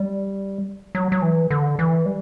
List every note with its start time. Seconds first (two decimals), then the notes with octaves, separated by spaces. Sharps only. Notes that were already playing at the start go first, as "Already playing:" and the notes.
Already playing: G3
0.95 F#3
1.12 F#3
1.22 E3
1.51 D3
1.79 E3
2.06 G3